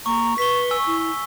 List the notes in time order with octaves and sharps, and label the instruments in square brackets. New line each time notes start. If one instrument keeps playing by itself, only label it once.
[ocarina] A#3 [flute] A#5 [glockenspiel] C#6
[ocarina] B4 [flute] C#6 [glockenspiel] B6 G7
[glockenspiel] G#5 E6
[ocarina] E4